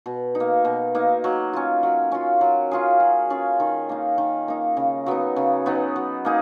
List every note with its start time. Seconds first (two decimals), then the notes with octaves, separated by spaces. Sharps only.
0.06 B2
0.35 D#4
0.40 A#3
0.65 B2
0.95 A#3 D#4
1.24 F#3
1.53 C#4 F4
1.83 F#3
2.12 C#4 F4
2.41 F#3
2.71 C#4 F4 G#4
3.00 F#3
3.30 C#4 F4 G#4
3.60 D#3
3.89 A#3 D#4
4.18 D#3
4.48 A#3 D#4
4.77 C#3
5.06 F#3 B3 D#4
5.36 C#3
5.66 F#3 B3 D#4
5.96 F#3
6.25 A#3 D#4 G#4